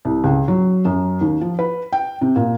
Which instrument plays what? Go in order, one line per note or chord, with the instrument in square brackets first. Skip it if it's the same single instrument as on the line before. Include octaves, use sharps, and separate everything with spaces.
[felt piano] C2
C#2
F#3
F#2
D#2
F3
B4
G5
C3
A#2